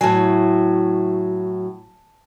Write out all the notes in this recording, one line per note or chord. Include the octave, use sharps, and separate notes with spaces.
A2 F#3 G#5 A5